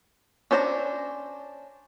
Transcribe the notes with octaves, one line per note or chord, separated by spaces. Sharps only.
C#4 D4 C5 F5 A#5